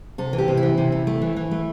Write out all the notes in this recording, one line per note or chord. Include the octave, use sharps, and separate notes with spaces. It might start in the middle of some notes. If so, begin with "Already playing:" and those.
C3 A4
E3
G4
C3
E4
E3
C3
C3
A3
E3
E3
A3